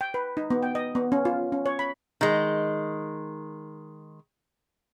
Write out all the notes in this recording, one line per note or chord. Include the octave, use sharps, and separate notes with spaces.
G5
B4
D#4
B3
G5
D#5
B3
C#4
F4
C#4
C#5
B5
D#3 G#3